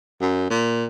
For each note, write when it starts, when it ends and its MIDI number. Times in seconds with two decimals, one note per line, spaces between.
0.21 0.46 42
0.50 0.86 46